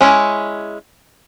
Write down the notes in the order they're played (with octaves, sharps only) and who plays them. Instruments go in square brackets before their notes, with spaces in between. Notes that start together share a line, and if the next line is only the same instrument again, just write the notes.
[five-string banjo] G#3 C#4 E4